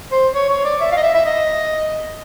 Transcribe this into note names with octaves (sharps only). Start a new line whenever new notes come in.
C5
C#5
C#5
D5
E5
F5
D#5
E5
E5
D#5